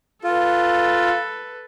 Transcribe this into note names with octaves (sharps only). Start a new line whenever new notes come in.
F4 A4 B4